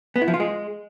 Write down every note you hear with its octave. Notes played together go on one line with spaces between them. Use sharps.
B3
E4
F3
F4
G#3